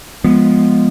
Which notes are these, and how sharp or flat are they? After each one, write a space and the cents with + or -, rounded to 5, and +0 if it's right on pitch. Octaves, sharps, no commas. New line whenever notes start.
F3 +0 G#3 +0 B3 +0